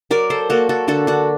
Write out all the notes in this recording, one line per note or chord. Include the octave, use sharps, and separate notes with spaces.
F#3 A#4 D5
A4 C5
A#3 F#4 A4
F#4 A4
D3 F#4 A4
D4 F#4